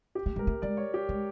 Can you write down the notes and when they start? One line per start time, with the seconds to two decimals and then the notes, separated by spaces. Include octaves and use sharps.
0.15 G4
0.26 A3
0.36 G#3 A#4
0.47 A3
0.62 G#3 D5
0.77 C#5
0.94 G4
1.09 G#3